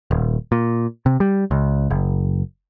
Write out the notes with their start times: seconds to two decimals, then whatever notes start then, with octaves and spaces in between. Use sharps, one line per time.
0.11 D#1
0.52 A#2
1.06 C3
1.20 G3
1.51 C#2
1.90 F#1